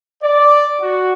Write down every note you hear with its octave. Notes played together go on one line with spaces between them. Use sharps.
D5
F#4